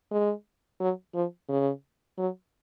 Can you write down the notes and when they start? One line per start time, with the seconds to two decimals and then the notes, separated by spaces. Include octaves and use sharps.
0.11 G#3
0.80 F#3
1.14 F3
1.49 C#3
2.17 F#3